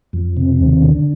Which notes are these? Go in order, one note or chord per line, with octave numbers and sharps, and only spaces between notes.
F2
C3
D#2
D3